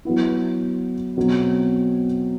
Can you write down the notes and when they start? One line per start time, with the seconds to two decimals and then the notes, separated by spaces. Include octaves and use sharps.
0.05 F#3 B3 E4
1.17 B2 F#3 C4